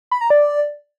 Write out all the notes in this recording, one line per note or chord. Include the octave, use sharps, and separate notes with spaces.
B5
A#5
D5